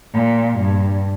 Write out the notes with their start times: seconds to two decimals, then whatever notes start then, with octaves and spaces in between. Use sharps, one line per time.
0.14 A#2
0.58 G2